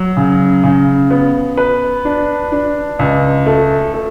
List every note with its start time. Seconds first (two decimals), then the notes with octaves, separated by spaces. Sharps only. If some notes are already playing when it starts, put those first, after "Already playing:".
Already playing: F#3
0.17 C#3
0.64 C#3
1.11 B3
1.57 B4
2.05 D4
2.52 D4
2.99 C#2
3.46 A3
3.94 A3